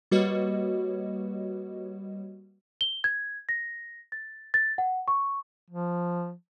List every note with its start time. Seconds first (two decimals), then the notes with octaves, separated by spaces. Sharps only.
0.11 G3 A#3 F#4 B4 C#5 D#5
2.81 G7
3.04 G#6
3.49 A#6
4.12 A6
4.54 A6
4.78 F#5
5.08 C#6
5.70 F3